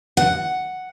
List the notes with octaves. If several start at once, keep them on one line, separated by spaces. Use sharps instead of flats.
F#5